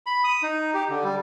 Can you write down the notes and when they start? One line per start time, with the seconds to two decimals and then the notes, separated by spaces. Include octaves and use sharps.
0.06 B5
0.24 D#6
0.43 D#4
0.74 G4
0.90 D3
1.04 G3